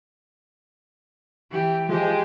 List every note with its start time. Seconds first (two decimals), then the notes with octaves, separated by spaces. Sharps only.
1.51 E3 G4
1.89 F3 G#3 G4 G#4